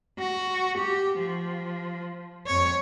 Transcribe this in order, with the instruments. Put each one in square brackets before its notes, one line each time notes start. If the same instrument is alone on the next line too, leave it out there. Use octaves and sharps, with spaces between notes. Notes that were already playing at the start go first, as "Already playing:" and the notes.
[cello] F#4
G4
F3
F2 C#5